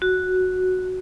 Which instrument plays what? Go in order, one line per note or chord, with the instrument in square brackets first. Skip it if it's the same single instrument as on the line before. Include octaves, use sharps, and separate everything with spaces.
[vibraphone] F#4